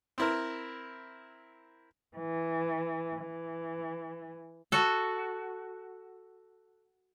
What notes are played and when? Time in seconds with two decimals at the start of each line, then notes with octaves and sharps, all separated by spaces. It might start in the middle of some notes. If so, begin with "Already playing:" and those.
0.18 C4 E4 A#4
2.17 E3
3.19 E3
4.72 F#4 A4